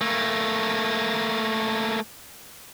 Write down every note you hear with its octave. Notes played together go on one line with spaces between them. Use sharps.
A3 A#3